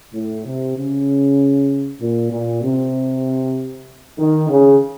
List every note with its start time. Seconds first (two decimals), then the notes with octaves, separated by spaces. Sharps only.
0.14 A2
0.45 C3
0.77 C#3
2.01 A#2
2.31 A#2
2.63 C3
4.19 D#3
4.49 C#3